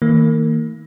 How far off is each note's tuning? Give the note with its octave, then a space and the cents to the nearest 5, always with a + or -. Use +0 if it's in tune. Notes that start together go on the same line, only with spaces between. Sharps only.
D#3 +35 A#3 -30